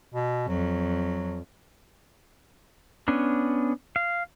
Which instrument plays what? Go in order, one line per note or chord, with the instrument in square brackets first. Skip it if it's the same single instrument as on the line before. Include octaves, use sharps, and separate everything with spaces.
[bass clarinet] B2
[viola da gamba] F2 [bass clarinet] F#3
[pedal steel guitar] B3 C#4 D4
F5